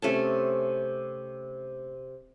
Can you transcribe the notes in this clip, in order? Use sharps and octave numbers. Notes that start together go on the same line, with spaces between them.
C3 A3 C#4 A5